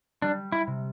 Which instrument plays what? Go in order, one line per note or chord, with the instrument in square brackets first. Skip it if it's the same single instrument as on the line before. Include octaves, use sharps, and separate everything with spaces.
[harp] G3 [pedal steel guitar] D4
[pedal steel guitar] E4
[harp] C3